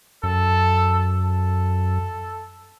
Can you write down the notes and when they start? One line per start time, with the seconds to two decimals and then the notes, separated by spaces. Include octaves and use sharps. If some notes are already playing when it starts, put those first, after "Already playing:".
0.23 F#2 A4
1.23 A4